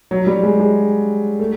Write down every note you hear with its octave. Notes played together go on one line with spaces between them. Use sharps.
F#3
G3
G#3
G#3
A3